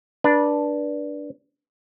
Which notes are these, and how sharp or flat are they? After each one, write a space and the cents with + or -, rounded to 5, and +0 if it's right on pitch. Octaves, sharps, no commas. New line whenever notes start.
D4 +0 B4 -30